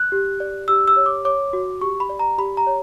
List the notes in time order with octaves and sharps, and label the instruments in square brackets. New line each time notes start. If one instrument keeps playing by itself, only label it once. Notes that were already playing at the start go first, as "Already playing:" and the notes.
Already playing: [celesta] F#6
G4
D5
G4 E6
E6
C#5
D6
C#5 D6
F#4
G4 C#6
B5
D5
A#5
G4 B5
A#5
C#5